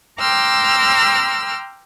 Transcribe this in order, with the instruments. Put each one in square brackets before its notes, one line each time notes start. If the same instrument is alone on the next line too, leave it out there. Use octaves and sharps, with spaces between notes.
[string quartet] G5 A#5 C6 D6 E6 F6